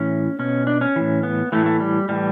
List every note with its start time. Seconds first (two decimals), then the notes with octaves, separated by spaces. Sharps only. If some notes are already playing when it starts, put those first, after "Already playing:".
Already playing: A2 E3 C#4
0.39 B2 C#4
0.67 D4
0.81 C#4
0.96 A2 E3
1.23 B3
1.52 A2 E3 A3
1.66 A3
1.80 G3
2.09 A2 E3 G3